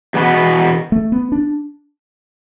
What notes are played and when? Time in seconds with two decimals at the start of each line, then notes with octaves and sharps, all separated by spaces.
0.14 E2 B2 B3 F#4 B4
0.92 A3
1.12 B3
1.32 D4